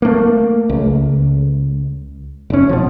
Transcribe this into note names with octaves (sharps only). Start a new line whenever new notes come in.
A3 A#3
C#2
F1 C#4
B2 F3